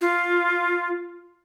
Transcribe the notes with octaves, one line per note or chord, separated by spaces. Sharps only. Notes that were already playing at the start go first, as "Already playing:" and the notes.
F4